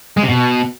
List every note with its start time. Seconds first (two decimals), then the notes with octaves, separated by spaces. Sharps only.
0.17 G#3
0.23 C3
0.29 B2